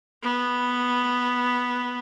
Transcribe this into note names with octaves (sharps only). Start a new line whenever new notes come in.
B3